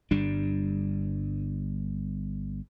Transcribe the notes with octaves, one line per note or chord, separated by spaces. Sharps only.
G1 G2 G3 D4